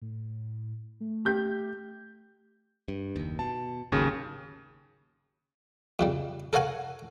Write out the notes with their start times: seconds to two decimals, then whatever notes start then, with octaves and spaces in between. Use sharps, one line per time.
0.02 A2
1.00 A3
1.25 G4 G6
2.88 G2
3.16 F#1 D#2
3.39 B2 A5
3.92 G#1 D#2 C#3 F#3
5.99 F2 C#3 G3
6.53 A4 A#4 C#5 F5 F#5 G#5